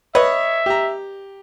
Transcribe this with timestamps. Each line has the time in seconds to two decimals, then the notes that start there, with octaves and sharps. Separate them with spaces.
0.15 B4 C#5 D#5 E5
0.66 G4 A#5